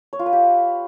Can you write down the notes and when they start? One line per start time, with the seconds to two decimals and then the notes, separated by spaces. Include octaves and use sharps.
0.13 C#5
0.19 F4
0.26 B4
0.33 G4